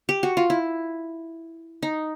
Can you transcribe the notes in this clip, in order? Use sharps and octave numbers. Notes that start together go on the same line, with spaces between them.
G4
F#4
F4
E4
D#4